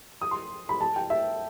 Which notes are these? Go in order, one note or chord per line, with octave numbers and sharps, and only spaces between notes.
D#6
C6
B5
A5
G5
E5